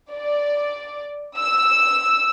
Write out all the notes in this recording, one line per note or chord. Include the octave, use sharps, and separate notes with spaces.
D5
E6